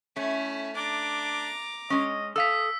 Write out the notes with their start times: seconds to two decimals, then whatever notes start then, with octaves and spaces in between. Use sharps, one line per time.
0.16 A3 C#4 E4
0.76 D4 A#5 D6
1.90 G#3 C#4 D#5
2.36 A4 F5 D#6 E6 B6